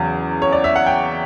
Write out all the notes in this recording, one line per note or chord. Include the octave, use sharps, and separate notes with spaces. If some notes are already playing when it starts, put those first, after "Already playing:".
Already playing: E2 C#3 F#3
C#5
D5
E5
F#5
G5